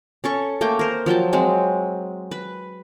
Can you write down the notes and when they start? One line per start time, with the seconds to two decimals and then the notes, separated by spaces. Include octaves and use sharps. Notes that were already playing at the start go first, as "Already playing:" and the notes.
0.24 C#4 A4 C#6
0.61 A3 A#3 G5
0.79 A#4 C5
1.06 F3 F#3 G5 A5
1.33 F#3 G#3 C4
2.31 B4